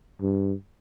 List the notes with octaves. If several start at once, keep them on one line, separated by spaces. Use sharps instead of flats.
G2